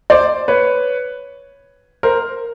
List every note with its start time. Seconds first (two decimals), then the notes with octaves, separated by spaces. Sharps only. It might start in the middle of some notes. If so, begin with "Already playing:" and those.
0.10 C5 D5
0.48 B4 C#5
2.03 A#4 C5